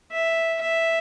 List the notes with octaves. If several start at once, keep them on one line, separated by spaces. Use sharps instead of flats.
E5
E5